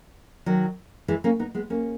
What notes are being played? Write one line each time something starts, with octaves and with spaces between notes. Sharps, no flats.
D#3 F#3
E3 G#3
A#3 C#4
B3 D#4
G#3 B3
A#3 C#4